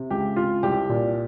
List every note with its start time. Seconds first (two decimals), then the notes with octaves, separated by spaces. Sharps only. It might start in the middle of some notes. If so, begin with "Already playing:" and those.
Already playing: C3
0.10 C#2 G4
0.36 C3 F4
0.63 C2 G4
0.89 A#2